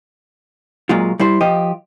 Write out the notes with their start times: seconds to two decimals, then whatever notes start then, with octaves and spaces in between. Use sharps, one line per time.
0.89 A#2 F#3 G#3 F4
1.19 G3 E4 C5
1.41 F3 G4 D#5